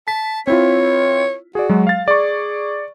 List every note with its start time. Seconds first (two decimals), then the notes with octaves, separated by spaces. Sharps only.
0.08 A5 B6
0.47 C4 E4 F4 C#5
1.55 F#4 G#4 D5
1.69 F#3 G#3
1.87 F5 A6
2.08 G#4 D5 C#6